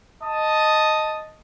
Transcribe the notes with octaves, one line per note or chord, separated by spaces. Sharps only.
D#5 A5 D#6